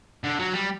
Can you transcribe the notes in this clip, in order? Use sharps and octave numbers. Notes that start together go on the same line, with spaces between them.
D3
F#3
G3